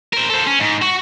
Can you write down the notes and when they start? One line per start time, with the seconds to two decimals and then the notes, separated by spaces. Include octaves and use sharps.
0.13 A#4 C5
0.30 A4 C5
0.47 C#4
0.60 G#2
0.82 F#4